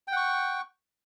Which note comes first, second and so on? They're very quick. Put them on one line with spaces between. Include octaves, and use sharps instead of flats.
G5 F#5 C#6